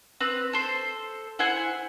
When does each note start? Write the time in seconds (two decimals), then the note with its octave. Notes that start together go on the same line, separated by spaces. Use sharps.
0.20 C4 B4
0.53 A4 C5
1.39 E4 C5 F#5 G#5